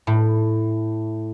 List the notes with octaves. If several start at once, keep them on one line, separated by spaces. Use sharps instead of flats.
A2